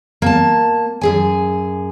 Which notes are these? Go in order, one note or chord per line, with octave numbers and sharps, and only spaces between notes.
A#3 G#5 A5
F#2 G#4 G#5